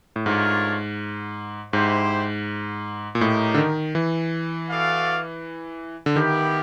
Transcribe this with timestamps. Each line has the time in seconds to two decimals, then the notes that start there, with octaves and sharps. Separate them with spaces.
0.16 A2
0.26 G#2 A3 D4 F4 A#4 C#5
1.73 G#2 E4 G4 C5
3.15 A#2
3.21 A2 D#4 G4 A#4
3.54 D3
3.58 D#3
3.95 E3
4.69 F#4 A4 D5 F5
6.06 D3
6.16 D#3 B3 E4 G4